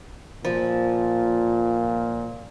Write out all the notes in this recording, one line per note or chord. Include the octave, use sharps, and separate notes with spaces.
A#2 F3